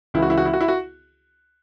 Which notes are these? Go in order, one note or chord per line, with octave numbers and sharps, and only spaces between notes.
C#2 C#3 E3 E4
F#4
E4
F#4
E4
F#4
E4
F#4